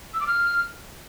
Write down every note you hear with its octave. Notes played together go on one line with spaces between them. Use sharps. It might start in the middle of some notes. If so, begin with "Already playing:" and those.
E6
D6
F6